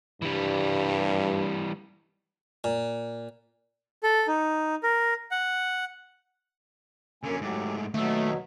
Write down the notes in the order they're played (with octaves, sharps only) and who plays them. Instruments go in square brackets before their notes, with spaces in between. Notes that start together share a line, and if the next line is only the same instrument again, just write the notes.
[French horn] G2 [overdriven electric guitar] E3 G3
[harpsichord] A#2
[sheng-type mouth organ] A4
D#4
A#4
F#5
[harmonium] F#2 A#3 G#5 [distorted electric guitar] D3 C#4
[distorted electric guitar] G#2 A3 [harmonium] F#3 G4
[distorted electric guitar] D#2 E5 [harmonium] B2 F#3 [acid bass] A3